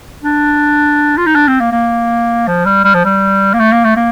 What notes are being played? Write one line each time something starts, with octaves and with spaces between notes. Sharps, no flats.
D4
F4
D#4
D4
C4
A#3
A#3
F3
G3
G3
F3
G3
A#3
A3
A#3
A3
A#3